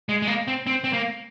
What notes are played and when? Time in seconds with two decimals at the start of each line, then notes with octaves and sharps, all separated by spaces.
0.09 G#3
0.22 G#3
0.27 A#3
0.48 C4
0.67 C4
0.84 C4
0.93 A#3